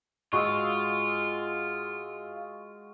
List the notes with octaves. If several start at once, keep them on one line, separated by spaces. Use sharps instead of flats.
G#2 G#3 F4 F#4 D#5 C#6 D#6 E6